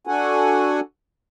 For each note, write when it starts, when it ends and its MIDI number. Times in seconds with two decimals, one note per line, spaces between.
0.07 0.80 62
0.07 0.80 66
0.07 0.80 69
0.07 0.80 78
0.07 0.80 80